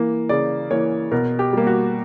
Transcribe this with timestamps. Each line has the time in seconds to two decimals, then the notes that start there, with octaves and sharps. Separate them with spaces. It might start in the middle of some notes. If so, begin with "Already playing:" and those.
Already playing: E3 A#3
0.29 C#3 D5
0.70 E3 A#3 C#5
1.11 B2 A#4
1.39 G4
1.53 G3 A#3
1.67 F#4